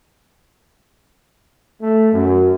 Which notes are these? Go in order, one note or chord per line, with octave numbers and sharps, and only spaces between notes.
A3
F#2